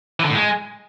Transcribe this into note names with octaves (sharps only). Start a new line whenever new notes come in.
E3
D3
A2
G#3